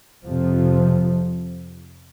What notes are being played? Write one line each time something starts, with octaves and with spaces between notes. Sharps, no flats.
F2 C3 F3